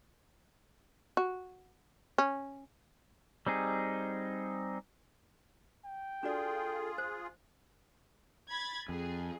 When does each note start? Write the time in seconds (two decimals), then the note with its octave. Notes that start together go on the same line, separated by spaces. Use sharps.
1.17 F#4
2.18 C#4
3.47 G3 C4 D#4 G#4
5.85 G5
6.23 D4 F4 F#4 G#4 A4 D5
6.98 C5
8.49 B5 G#6 A6
8.89 F2 G#4